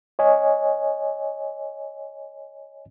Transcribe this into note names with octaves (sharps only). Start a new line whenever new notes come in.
C#5 D#5 G#5